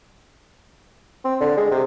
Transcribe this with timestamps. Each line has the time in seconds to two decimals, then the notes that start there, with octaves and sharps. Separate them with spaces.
1.25 C4
1.41 D3
1.57 G#3
1.72 C3